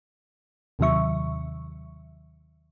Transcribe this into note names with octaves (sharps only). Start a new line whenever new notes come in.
D#2 C3 D#3 F#3 E5 C#6